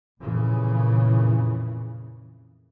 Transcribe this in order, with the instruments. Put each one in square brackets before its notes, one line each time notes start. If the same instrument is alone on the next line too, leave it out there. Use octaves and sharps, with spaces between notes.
[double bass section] F2 A#2 C#3 E3